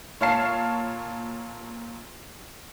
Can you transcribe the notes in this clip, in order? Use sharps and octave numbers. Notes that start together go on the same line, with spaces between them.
A#2 C#5 F5 A5 C7